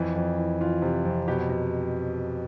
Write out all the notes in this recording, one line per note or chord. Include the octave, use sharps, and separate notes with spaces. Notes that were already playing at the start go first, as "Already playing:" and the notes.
Already playing: F2 E3
F2
E3
E3 F4
C3
F2
B2 G4
B2